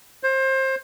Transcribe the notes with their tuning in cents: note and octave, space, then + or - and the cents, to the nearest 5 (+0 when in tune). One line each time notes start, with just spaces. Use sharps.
C5 +25